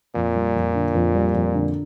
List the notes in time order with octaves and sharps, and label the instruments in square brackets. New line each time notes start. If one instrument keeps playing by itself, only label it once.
[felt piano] F2 [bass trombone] A#2
[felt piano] G3
F2
D3
F2
G3
F2
D3